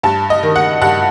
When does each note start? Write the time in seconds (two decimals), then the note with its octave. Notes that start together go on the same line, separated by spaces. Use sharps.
0.03 G2 A5
0.30 D#5
0.43 D#3
0.56 F#5
0.81 G2 F#5